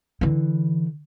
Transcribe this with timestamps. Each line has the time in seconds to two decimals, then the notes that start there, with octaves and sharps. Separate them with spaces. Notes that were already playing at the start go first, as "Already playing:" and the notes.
0.21 D3 E3